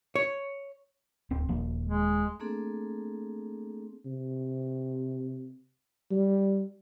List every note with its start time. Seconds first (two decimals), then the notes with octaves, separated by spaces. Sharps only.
0.16 C#5
1.30 D1 C4
1.49 D#1 F3 A#3
1.85 G#3
2.40 A3 A#3 C4 D4 G#4 A4
4.06 C3
6.11 G3